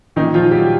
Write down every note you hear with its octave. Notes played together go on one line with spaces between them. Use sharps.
A#2 D#3 D#4
F3 F4
F#3 G3 G4